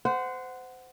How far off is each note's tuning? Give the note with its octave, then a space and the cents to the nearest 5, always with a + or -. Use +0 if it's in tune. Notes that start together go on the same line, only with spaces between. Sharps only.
C5 -25 F#5 +0